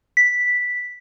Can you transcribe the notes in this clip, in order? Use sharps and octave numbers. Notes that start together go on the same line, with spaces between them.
B6